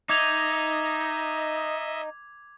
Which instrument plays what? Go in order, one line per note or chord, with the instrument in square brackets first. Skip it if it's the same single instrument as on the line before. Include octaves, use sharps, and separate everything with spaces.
[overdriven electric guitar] D#4 [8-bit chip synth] D#5 E5 [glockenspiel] D6 G#6 F7